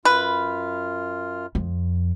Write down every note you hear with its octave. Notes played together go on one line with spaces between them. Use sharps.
F#2 F4 B4 F6
F2